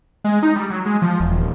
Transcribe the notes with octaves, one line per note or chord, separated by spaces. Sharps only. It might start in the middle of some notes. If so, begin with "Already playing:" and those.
G#3
D#4
G3
F#3
G#3
F3
E1
D#1